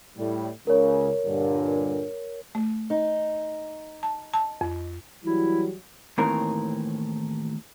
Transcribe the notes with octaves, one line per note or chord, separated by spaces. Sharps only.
A2 G3
C#2 C#3 A#4 C#5
G2 A#2 D3
A3
D#4
A5
A5
F2
E3 F#3 G3 E4
D#2 A2 D#3 E3 C4 A#4